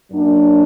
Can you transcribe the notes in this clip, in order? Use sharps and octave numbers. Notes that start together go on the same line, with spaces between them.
F#2 F#3 A#3 D4